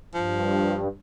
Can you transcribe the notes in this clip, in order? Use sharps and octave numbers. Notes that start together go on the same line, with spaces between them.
G2 F3